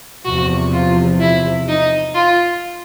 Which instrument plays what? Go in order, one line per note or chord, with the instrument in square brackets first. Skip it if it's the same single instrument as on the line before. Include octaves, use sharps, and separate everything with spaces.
[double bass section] E2 C3 F3 [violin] F#4
[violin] F4
E4
D#4
F4